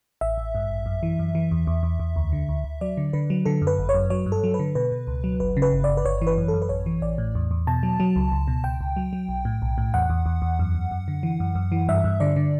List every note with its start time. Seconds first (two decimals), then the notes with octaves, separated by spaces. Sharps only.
0.21 A1 E5
0.38 A1
0.55 G2
0.71 A1
0.86 F#2
1.03 E3
1.19 F#2
1.35 E3
1.51 E2
1.67 E2
1.83 E2
2.00 E2
2.16 D2
2.32 D3
2.49 D2
2.64 D2
2.81 F#3 D5
2.97 D3
3.13 D3 B4
3.30 F#3
3.46 D3 A4
3.62 F#2
3.67 B4
3.79 G1
3.89 C#5
3.94 F#2
4.10 F#3 C#5
4.26 G2
4.32 A4
4.44 F#3
4.54 B4
4.59 D3
4.75 B2 B4
4.92 B2
5.07 C#2
5.24 F#3
5.40 G1 B4
5.57 C#3
5.62 B4
5.73 G1
5.84 D5
5.89 G1
5.97 B4
6.05 G1 C#5
6.22 E3
6.27 B4
6.37 F#2
6.48 A4
6.54 F#2
6.62 B4
6.69 A1 C#5
6.86 E3
7.02 A1 D5
7.18 A2
7.35 E2
7.51 E2
7.67 B2 A5
7.83 F#3
8.00 F#3
8.16 C#2
8.32 C#2
8.48 B2
8.64 C#2 G5
8.81 C#2
8.97 F#3
9.13 F#3
9.29 B1
9.45 A2
9.62 B1
9.78 A2
9.94 E2 F#5
10.10 E2
10.26 E2
10.42 E2
10.59 F#2
10.75 F#2
10.91 F#2
11.08 D3
11.23 E3
11.40 F#2
11.55 F#2
11.72 E3
11.89 G2 E5
12.04 G2
12.20 D3 D5
12.36 D3